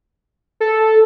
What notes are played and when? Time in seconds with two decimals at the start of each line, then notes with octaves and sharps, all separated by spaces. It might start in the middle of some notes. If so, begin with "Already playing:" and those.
0.61 A4